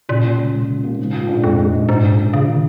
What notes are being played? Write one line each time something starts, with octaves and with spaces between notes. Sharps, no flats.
A#2 C#3
A#3
C#2
C#2
C#3
A#3
G#2
F4
A#1
F2 G#2
G#3
A#1
A#1 G#2
A#1
A#1
A#1 C#3
D#3